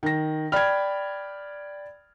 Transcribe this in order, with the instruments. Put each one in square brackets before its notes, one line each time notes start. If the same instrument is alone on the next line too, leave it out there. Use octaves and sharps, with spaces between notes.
[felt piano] D#3 A#6
[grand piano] D5 B5 F6 [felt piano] G5 G#6